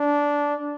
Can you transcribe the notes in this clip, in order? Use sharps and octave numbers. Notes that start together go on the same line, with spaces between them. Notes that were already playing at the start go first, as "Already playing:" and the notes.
Already playing: D4